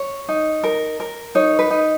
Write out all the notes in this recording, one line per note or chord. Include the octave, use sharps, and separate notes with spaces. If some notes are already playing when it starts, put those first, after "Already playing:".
Already playing: C#5
D#4
A#4
A#4
D#4 C#5
B4
D#4